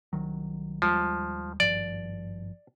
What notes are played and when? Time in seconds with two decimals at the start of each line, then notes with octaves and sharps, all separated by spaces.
0.13 C2 D#3 F#3
0.82 D#2 F3 G3 G#3
1.60 G#1 G2 F3 D5